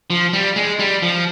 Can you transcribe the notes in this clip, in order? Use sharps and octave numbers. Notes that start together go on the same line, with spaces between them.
F3
G3
G#3
G3
F3